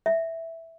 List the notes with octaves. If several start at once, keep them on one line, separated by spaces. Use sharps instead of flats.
E5